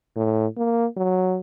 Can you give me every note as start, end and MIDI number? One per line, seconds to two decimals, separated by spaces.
0.16 0.47 45
0.57 0.86 58
0.97 1.41 54